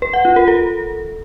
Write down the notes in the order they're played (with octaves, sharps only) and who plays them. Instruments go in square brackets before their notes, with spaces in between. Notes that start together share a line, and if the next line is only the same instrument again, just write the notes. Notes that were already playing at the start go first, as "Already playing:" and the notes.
[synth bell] B4
F#5
F4
A#4
A4